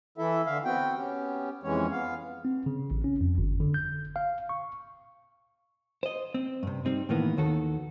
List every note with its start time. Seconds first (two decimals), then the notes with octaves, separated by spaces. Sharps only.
0.18 E3 E4 A4 E5
0.46 D3 E5 F5
0.65 B3 C4 F#4 G5
0.96 B3 C#4 G4
1.63 F2 E3 G#3 C#4 C#5
1.91 B3 F5
2.45 C4
2.66 C#3
2.91 A1
3.04 C#4
3.21 F2
3.38 G1
3.60 D3
3.74 G6
4.16 F5
4.49 C#6
6.03 C5 D#5
6.34 C4
6.63 G2 C3
6.85 G3 C4 D#4
7.09 A2 D#3 E3 A#3 B3
7.37 D#2 D#3 F#4 A4